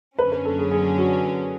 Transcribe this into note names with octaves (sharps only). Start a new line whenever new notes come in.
F#2 D3 F#3 C#4 B4
B4
A4
G#4
G#4
F#4